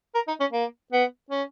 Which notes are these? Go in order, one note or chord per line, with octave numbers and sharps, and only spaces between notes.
A#4
D#4
C#4
A#3
B3
C#4